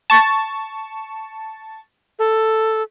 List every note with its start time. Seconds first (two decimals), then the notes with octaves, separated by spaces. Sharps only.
0.10 A5 C#6
2.19 A4